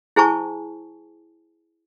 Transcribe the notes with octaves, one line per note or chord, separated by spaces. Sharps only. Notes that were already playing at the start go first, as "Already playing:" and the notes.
E4 G#4 C5 G#5 A5 C#6